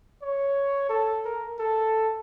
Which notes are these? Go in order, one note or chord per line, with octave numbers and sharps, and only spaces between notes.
C#5
A4
A#4
A4